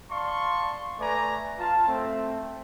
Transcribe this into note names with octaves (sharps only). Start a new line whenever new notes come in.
D5 F5 A5 C6 C#6
A3 B4 D5 G#5 A#5
F4 A5
A3 C4